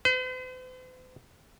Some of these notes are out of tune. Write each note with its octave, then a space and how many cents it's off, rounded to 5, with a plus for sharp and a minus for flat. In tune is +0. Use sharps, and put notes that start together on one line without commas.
C5 -45